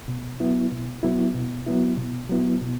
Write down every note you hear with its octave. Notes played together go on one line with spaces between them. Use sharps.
B2
F#3 B3 E4
B2
F#3 B3 E4
B2
F#3 B3 E4
B2
F#3 B3 E4
B2